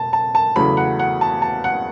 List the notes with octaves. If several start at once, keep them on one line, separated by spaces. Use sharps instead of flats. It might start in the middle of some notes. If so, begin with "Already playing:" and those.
Already playing: E1 A5
A5
A5
E2 C#3 F#3 A3 B5
F#5
F#5
A5
A5
F#5